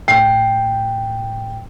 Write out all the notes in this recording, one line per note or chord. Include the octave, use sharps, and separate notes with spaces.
A2 G5 C7